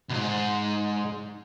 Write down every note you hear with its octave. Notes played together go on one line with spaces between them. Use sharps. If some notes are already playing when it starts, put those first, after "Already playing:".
C2 G#2